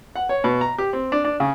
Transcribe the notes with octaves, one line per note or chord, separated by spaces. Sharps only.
F#5
C#5
B2
A#5
G4
C4
D4
D4
C#3